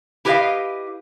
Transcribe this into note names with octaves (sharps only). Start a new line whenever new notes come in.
E4 G4 B4 C#5 D#5 F5